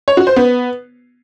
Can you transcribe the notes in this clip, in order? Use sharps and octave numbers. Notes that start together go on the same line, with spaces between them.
C#5
F#4
C5
B3